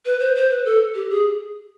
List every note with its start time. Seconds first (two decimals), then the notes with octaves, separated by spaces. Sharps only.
0.06 B4
0.20 C5
0.35 C5
0.50 B4
0.65 A4
0.95 G4
1.10 G#4